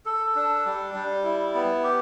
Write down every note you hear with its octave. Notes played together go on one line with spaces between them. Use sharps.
A4
D4
G3
G3
E4
B3
G4